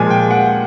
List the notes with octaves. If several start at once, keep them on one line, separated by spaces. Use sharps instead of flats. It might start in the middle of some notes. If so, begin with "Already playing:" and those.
Already playing: A#2 F3 G#3 G#5
G5
F#5